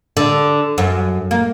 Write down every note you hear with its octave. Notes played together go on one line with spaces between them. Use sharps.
D3
F#2
A#3